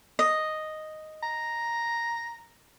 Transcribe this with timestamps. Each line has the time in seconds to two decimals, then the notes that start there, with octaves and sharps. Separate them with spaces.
0.19 D#5
1.23 A#5